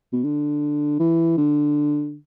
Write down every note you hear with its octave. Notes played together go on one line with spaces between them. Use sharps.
B2
D3
E3
D3